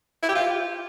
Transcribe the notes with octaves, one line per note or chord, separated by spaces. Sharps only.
E4
G4
F4